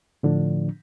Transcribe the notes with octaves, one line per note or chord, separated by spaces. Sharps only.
A2 D3 F3 D4